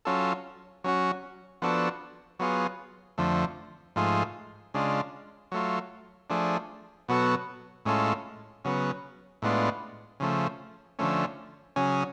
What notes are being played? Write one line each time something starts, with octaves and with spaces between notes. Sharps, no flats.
F#3 C#4 F4 A4
F#3 C#4 F#4
F3 B3 D4 F#4 A4
F#3 B3 F4 G#4
F2 D3 F3 A3
G#2 F3 A3 F4 G#4
C#3 G#3 D4 F4
F#3 A3 F4
F3 A3 D4 G#4
B2 F#3 B3 F#4 A4
A2 G#3 C#4 F4 A4
C#3 F#3 B3
A2 G#3 B3 D4 F4
C#3 F3 A3
D3 F3 A3 C#4
C#3 F#3 C#4 G#4